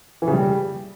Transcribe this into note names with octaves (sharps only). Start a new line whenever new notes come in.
E3
C#3
G3